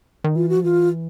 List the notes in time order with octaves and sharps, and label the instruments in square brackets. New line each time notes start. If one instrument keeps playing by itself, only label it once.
[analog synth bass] D#3
[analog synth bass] E3 [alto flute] F4
[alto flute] F#4
[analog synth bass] F3
[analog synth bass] E3 [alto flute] F4